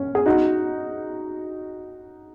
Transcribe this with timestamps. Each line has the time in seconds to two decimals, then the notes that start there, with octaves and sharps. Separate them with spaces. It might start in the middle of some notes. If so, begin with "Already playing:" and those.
Already playing: C#4
0.15 G#4
0.26 D#4 F#4